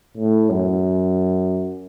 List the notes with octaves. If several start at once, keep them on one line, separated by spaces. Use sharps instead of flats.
A2
F#2